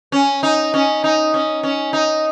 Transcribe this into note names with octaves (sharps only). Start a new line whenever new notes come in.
C#4
D#4
C#4
D#4
C#4
C#4
D#4